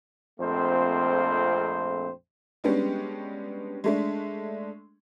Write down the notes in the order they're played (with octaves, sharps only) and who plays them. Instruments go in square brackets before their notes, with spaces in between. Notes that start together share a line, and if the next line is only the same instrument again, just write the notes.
[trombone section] A#1 F2 A3 C4 C5
[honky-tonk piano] G3 G#3 B3 C#4 D4 G4
G#3 A3 D4